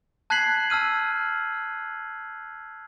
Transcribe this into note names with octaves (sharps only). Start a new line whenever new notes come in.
A5 F#6 G#6 B6 C7 F#7
A5 E6 F6 D#7